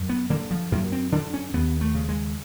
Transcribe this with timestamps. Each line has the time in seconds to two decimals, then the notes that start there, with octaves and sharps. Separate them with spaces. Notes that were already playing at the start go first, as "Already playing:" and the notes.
Already playing: F#2
0.09 B3
0.30 D3 A#3
0.51 F3
0.72 F#2 A#3
0.92 C4
1.12 D3 D4
1.34 C#4
1.53 D#2 B3
1.81 A3
1.95 C#3
2.09 G#3